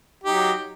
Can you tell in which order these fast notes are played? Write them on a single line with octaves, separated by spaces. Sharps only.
G4 D#4 F#3